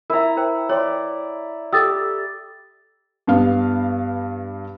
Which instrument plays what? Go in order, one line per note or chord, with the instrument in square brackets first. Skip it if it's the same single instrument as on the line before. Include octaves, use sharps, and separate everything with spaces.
[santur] E4 A#5 [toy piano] A#4 E5 [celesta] E6
[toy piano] A#4 C5 G5
[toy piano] C#5 G5 C6 [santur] D5
[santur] G4 [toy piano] A4 D#6 [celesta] E6 A6
[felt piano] G2 B3 F5